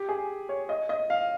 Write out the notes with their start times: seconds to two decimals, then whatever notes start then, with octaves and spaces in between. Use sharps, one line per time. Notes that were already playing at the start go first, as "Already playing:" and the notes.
Already playing: G4
0.09 G#4
0.49 C#5
0.69 D#5
0.89 D#5
1.10 F5